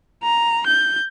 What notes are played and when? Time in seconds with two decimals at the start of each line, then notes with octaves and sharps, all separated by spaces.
0.23 A#5
0.67 G6